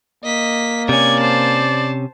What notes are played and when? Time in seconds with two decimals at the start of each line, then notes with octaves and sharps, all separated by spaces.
0.24 A#3 D#5 B6
0.89 C3 C#4 D5 G#6
1.21 C5 A5